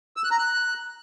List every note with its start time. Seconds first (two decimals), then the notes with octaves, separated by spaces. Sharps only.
0.17 E6
0.24 F#6
0.31 A#5
0.39 F#6